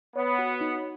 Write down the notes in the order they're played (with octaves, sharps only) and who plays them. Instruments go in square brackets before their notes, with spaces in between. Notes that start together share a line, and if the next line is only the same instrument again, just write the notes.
[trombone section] B3 [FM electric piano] C#5
[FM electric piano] F#4
D#4